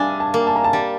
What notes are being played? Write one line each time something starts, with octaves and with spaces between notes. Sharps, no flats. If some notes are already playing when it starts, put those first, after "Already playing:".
Already playing: G3 D4 E5 F5 G#5
A5
A#3
A5
A#5
A5
G3